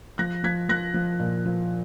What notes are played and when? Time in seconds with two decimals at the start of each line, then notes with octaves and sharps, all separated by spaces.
0.18 F3 F#6 A#6
0.44 F3 G#6 B6
0.69 F3 F#6 A#6
0.94 F3
1.20 A#2
1.46 F3